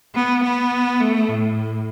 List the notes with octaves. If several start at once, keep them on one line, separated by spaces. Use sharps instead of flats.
B3
B3
A3
A2